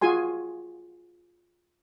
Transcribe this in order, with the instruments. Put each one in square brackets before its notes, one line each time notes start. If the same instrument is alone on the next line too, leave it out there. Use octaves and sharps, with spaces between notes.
[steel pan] F4 F#4 G#4 G#5 C6